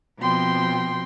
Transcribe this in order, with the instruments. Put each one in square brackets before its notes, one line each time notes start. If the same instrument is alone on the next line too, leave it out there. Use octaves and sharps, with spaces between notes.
[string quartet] B2 F3 C4 G5 C6